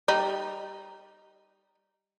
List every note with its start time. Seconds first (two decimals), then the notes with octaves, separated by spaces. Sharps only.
0.08 G3 D#4